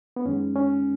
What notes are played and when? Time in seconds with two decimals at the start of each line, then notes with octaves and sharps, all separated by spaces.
0.16 B3
0.25 F#2 D#3 G#3 C#4
0.56 C#4